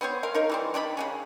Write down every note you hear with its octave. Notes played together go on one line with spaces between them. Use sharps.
B3 C4 C5 C#5
A#4 F5
D#4 A#4 C#5
E3 G3 C4
D#3 D4 G#4 B5
C#3 A#3 C#4